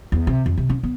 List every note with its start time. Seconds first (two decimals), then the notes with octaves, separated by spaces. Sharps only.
0.12 E2
0.27 C3
0.46 F2
0.57 C3
0.69 C#4
0.83 B3